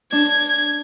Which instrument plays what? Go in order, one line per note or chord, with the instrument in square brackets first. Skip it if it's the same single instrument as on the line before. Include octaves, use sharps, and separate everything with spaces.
[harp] D4 [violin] G#6